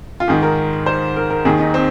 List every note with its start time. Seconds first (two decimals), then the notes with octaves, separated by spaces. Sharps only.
0.20 F4
0.28 G#2 D#3 G#4
0.42 A#4
0.86 C5
1.16 A#4
1.30 A#4
1.45 D#2 D#3 G#4
1.59 D#4
1.74 C4